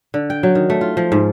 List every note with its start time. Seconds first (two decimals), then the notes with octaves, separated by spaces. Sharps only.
0.14 D3
0.30 G5
0.43 F#3
0.55 D#3
0.70 A3
0.81 F4
0.97 F3
1.12 G#2